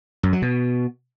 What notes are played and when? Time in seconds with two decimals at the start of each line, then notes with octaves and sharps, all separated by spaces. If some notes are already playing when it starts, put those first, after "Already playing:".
0.23 F#2
0.33 F#3
0.42 B2